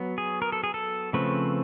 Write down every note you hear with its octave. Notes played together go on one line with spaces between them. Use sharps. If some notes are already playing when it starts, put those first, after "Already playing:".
Already playing: F#3 B3
G#4
A#4
A4
G#4
A4
C#3 F3 A3 C4 B4